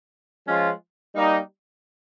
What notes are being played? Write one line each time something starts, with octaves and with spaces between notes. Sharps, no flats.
F3 G#3 C#4 F4
G3 A#3 D#4